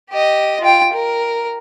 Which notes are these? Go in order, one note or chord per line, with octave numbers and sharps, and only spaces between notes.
G4 D#5
F4 G5
A#4